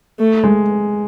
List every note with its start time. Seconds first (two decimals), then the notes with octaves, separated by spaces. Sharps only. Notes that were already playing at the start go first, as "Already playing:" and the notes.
0.20 A3
0.44 G#3